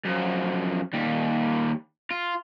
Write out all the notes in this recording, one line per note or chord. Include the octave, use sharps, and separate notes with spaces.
F#2 F3
D#2 G3
F4